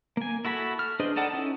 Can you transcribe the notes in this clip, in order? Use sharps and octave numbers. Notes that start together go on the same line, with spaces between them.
A#3 G#5
E4 F#4 A4 B5
F6
D4 G#4 B4 C5 D#5
D#4 A4 D5 F#5 A5
C#4 D#4 E4